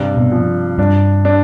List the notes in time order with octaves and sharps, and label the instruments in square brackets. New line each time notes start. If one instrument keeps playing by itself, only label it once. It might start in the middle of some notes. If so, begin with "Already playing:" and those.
Already playing: [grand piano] G2 C3
[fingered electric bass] B2
[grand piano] F3
[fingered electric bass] G2 [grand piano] D4
[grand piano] D4